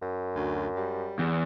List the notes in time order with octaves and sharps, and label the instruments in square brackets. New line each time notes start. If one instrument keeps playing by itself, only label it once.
[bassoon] F#2
[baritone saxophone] D2
G3
[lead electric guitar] E2